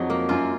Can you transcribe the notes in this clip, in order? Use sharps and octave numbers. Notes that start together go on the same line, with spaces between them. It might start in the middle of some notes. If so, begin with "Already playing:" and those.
Already playing: F2 F#3 D#4 G#4
A#3
F#2 F4